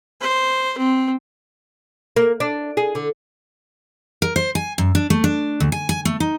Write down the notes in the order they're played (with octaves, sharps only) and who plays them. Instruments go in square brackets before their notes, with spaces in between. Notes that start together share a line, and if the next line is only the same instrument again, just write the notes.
[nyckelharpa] C5
C4
[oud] A#3
D4
G#4
D3
[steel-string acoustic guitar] A#4
C5
G#5
F#2
D4
A3
D4
D2
G#5
G#5
A3
D#4